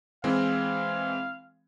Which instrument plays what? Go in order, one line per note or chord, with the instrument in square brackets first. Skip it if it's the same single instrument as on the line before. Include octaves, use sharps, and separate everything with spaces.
[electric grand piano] E3 G#3 C4 [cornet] F5